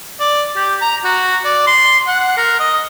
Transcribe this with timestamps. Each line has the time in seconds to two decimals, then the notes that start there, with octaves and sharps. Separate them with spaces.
0.20 D5
0.56 G4
0.82 A#5
1.04 F#4
1.45 D5
1.67 C6
2.07 F#5
2.37 A#4
2.60 D#5